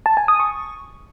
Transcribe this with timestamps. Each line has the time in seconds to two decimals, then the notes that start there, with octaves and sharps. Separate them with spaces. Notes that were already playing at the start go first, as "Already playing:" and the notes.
0.06 A5
0.17 G#5
0.28 D#6
0.40 C#6